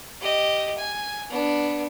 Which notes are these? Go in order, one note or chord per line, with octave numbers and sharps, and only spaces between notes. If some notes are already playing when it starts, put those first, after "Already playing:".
G4 D#5
G#5
B3 D4